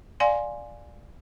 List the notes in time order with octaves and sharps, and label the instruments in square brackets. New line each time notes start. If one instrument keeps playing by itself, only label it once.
[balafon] D5 F5 G#5 C6